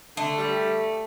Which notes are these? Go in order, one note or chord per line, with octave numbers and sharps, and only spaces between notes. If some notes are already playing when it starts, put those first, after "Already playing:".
D3 A3
G3